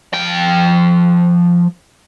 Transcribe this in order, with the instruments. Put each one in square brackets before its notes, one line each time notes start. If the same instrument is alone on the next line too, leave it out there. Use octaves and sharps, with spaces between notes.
[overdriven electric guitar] F3 G5